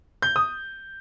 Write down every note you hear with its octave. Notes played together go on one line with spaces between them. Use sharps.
G6
D#6